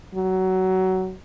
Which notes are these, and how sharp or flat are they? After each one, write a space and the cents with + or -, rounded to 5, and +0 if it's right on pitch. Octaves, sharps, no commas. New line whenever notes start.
F#3 +20